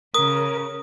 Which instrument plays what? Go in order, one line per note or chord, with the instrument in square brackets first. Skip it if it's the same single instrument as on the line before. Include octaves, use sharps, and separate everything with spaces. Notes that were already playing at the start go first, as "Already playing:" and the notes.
[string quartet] C#3 [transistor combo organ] A#4 [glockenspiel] D#6